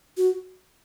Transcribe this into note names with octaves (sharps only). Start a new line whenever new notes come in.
F#4